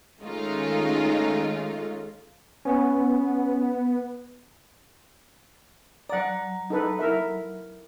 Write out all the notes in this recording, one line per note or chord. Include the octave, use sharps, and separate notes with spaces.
D#3 G#3 A3 C#4 D#4 F4
B3 C#4
F#3 D5 F#5 A#5
D#4 A4 B4
E4 A#4 E5